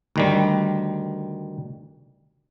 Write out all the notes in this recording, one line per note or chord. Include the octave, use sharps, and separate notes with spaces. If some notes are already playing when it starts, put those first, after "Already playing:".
D2 D#3 G3